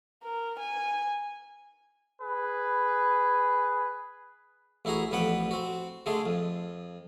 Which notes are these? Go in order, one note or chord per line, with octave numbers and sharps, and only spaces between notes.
A#4
G#5
G#4 B4
A1 E4 F#4 G#4 A#5
A1 F2 B3 B4 F#5 G5
C4 F#4
D3 G#3 A3 G#4
F2